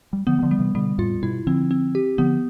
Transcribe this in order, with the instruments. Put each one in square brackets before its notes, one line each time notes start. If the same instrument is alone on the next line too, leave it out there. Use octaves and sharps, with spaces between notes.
[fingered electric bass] G3
[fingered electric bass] D3 F3 [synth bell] B3
[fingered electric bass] G3
D3 F3
[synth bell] G3
[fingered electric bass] C3 E3
[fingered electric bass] B2 D3 [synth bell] G3
[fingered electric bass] F2 A2 [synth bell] F4
[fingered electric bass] G2 B2 [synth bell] E4
[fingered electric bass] D3 F3 [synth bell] C4
[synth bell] C4
G4
[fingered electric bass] D3 F3 [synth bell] B3